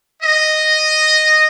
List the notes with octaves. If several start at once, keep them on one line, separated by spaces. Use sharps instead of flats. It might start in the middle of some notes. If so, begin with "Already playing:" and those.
D#5